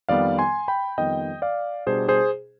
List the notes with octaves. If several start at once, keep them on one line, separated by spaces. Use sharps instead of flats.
F2 D#3 G3 B3 D5 F5
G#5 C6
G5 B5
F2 D#3 G3 B3 D#5 G5
D5 F5
B2 G3 D4 G#4 C5
G#4 C5